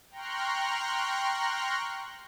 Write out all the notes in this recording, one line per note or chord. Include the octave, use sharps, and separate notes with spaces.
G5 A#5 C6 C#6 F6 F#6